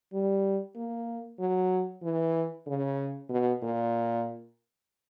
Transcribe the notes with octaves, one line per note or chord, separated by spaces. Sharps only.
G3
A#3
F#3
E3
C#3
B2
A#2